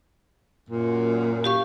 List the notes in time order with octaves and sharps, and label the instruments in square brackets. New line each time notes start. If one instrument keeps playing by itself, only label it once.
[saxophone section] F#2 A#2
[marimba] G4 F5 C#6